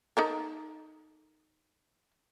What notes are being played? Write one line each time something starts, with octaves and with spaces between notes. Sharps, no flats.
D#4 A4 A#4